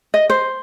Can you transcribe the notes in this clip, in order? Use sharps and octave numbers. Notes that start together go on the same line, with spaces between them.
D#5
C5